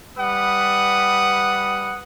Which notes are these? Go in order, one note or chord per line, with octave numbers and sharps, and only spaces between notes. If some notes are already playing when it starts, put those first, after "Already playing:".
G3 B4 F#5 D#6